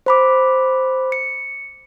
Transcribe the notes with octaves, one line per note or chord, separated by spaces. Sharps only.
C5 B5 D6
C#7